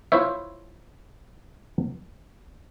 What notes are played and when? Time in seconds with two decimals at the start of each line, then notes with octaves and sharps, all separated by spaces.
0.12 E4 F4 C5 C#5 E5